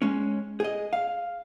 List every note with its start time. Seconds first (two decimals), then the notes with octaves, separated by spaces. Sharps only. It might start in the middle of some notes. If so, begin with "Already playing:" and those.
0.02 G#3 C#4
0.60 G#4 D#5
0.93 F5